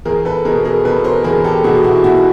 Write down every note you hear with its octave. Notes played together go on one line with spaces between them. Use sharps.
E2 G#4 A#4
A4 B4
B2 G#4 A#4
G#4 A#4
B2 A4 B4
A#4 C5
E2 G#4 A#4
G4 A4
B2 F#4 G#4
E4 F#4
B2 E4 F#4